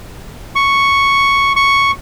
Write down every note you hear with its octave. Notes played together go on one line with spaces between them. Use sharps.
C#6
C#6